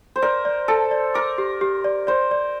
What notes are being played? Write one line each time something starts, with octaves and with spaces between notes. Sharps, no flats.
C5
A#4 D5
D5
A4 A5
D5
A#4 D6
G4
G4
D5
C5 D5
D5